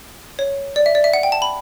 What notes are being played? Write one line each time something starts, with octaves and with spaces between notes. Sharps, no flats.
C#5
D5
E5
D5
E5
F#5
G5
A5
B5